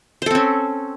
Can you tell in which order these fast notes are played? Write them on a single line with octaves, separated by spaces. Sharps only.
C5 A4 C4 C#4